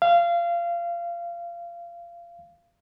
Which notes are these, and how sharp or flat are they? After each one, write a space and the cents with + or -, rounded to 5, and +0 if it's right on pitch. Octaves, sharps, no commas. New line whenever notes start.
F5 -25